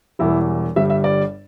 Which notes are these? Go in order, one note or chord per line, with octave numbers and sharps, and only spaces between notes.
E1 E2 E3 G3 E4
G1 G2 G3 E5
E5
D5